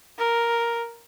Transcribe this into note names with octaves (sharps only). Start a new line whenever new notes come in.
A#4